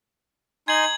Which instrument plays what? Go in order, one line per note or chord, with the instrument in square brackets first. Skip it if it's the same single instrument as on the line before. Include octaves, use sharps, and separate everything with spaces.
[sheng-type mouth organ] D#4 G#5 C6 [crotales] G#6 F#7